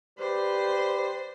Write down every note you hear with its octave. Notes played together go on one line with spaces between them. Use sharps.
G4 B4 C5 D5